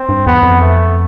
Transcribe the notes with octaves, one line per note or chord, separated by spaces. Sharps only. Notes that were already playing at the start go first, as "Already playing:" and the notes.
Already playing: C4
G2
E2 B3
F2
A3